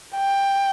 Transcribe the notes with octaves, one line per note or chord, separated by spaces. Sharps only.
G5